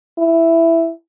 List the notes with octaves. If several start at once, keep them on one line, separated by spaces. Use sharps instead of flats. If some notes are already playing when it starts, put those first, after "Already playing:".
E4